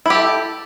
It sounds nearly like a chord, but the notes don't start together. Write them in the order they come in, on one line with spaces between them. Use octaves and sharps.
E4 G4 A4